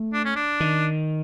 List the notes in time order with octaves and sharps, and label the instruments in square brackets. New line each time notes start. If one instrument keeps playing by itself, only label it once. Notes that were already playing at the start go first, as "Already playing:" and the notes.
Already playing: [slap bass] A3
[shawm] D4
C#4
D4
[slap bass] D#3